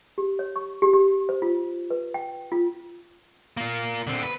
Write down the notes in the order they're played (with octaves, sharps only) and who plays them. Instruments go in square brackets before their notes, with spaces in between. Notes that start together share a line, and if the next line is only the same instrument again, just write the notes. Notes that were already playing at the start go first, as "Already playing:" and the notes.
[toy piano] G4
C#5
C#6
G4
G4
C5
F4
B4
G5
F4
[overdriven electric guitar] A#3 F4
D3 C4
B4